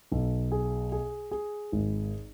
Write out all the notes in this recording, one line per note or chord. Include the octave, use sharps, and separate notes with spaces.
B1
G#4
G#4
G#4
G#1